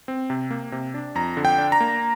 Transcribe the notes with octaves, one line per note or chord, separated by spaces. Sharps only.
C4
C3
A#3
C3
D4
F2 A#5
D3
G5
D4
A#5
A#3